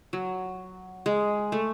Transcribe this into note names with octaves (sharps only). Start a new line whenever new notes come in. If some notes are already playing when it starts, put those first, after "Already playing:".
F#3
G#3
A3